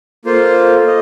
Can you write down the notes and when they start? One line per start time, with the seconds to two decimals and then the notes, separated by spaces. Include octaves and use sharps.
0.25 A#3 F4 A4 C5 F5
0.87 D#5